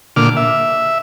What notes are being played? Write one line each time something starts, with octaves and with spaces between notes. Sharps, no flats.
A#2 D3 D6 F6
E5